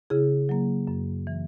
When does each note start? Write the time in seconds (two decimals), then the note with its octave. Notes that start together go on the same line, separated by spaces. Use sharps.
0.10 C#3 E4 G#4
0.49 F#3 A#3
0.87 F#2
1.27 E3 A#3